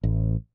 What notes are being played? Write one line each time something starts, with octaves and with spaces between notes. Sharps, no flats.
A1